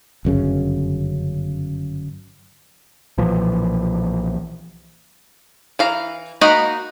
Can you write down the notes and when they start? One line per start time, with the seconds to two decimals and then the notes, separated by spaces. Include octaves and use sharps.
0.25 G1 F#2 C#3
3.18 B1 A#2 E3 F3
5.79 E3 F5 A#5
6.41 A#3 D#4 F#4 D#5 B5